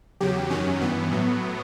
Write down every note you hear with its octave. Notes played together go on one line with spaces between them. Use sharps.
E2 C#3 F#3 G4
F#2 D#3 F#3 C#4
G2 E3 B3
A2 F#3